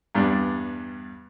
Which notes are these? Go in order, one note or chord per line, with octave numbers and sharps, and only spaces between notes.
E2 G2 G3 D4